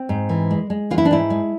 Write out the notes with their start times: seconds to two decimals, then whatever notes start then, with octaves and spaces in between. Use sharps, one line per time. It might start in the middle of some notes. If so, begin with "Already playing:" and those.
Already playing: C4
0.09 G#2
0.29 E3
0.51 G#3
0.70 G#3
0.90 E3 F4
0.98 E4
1.05 D4
1.11 G#2 E4
1.30 G#3